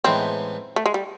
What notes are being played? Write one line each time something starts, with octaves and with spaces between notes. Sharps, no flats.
A2 E3 G#3 B3 C4 D#4
A3
G#3
G3